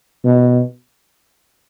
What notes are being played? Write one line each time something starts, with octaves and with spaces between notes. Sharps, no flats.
B2